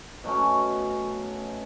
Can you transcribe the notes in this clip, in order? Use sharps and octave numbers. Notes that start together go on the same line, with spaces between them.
B2 F#3 A3 C#4